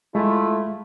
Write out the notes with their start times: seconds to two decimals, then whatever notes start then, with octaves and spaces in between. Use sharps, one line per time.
0.15 G#3 A3 E4 F4